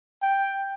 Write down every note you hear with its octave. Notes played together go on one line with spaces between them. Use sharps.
G5